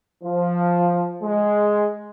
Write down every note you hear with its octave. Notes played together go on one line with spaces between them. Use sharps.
F3
G#3